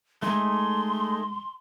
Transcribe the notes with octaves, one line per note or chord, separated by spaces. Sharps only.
G#3 A3 D#4 G#4 C6